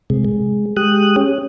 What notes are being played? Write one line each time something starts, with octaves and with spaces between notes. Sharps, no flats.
C3 G#3
G#3
G#3 G4 D#6 F#6
C#4